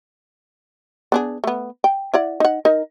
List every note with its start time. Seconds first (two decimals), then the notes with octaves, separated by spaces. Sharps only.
1.12 B3 D4 G#4
1.44 A3 B3
1.84 G5
2.14 E4 D5 F#5
2.40 D#4 F#5
2.65 D#4 A#4